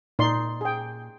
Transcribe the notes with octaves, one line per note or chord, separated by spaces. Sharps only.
A#2 D#4 D5 C6
G#4 G5